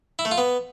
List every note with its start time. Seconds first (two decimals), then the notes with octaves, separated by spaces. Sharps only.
0.19 E4
0.25 A3
0.31 F4
0.38 B3